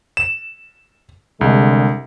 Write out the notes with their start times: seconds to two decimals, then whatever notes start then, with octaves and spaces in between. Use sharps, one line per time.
0.17 E7
1.41 C2 D3 G#3